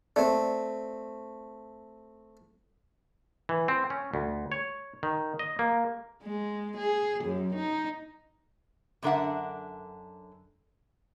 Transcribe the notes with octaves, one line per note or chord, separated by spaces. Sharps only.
A3 C4 D5
E3
C4
C#4
D2
C#5
D#3
D#5
A#3
G#3
G#4
F#2
D#4
F#2 D3 D4 A#4 E5 F#5